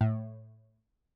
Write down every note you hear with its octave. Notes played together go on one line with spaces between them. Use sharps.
A2